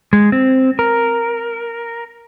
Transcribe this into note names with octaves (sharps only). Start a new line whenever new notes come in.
G#3
C4
A#4